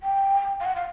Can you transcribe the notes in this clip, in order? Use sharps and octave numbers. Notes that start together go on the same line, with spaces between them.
G5
F5
F#5
F5